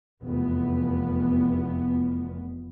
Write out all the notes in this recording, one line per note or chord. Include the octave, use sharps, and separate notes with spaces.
F1 E2 B3